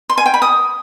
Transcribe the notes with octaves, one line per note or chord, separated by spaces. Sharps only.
C6
G#5
G5
B5
D#6